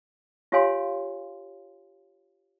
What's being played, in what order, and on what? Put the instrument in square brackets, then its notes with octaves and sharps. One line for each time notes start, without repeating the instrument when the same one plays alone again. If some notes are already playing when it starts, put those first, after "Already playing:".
[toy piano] F4 G4 C#5 F5 G#5 C6